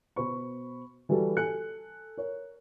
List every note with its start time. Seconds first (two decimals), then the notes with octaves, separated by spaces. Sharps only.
0.16 B2 C5 B5 C#6
1.09 E3 G3 E4 F#4 G4 A4
1.37 A4 G#5 F#6 C#7
2.17 A#4 C#5